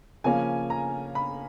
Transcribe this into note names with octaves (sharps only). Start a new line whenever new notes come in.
C#3 F3 A#3 C#4 G#5
A#5
B5